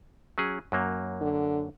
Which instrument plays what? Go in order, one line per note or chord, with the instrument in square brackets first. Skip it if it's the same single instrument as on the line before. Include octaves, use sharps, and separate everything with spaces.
[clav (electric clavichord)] F#3 C#4 G#4
F#2 F#3 A#3
[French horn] D3